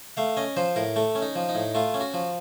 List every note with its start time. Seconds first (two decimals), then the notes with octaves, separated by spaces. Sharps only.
0.17 A3 F5
0.37 C#4 D#5
0.57 F3 C5
0.76 A2 A#4
0.96 A3 A4
1.15 C#4
1.22 D#4
1.36 F3
1.49 D#4
1.55 A2
1.75 A3 F4
1.94 C#4
2.01 F#4
2.14 F3